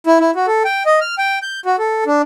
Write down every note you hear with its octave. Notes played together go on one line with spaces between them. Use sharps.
E4
E4
F#4
A4
G5
D#5
F6
G5
G6
F#4
A4
D4